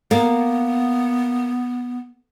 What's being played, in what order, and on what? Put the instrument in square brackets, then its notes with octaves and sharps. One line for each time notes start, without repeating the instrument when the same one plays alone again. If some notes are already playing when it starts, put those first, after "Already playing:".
[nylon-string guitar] A#3 [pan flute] B3